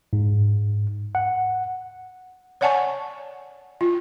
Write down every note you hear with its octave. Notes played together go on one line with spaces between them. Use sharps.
G#2
F#5
C#5 D5 F#5 G#5 A5 C#6
F4